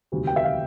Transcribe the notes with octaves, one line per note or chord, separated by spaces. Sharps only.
E1 D2 C3 D#3 G3
G5
E5
F5